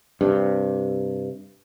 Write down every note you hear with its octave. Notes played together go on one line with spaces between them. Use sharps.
G2 C3